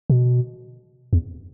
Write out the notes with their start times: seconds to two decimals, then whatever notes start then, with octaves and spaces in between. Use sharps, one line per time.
0.10 B2
1.13 E2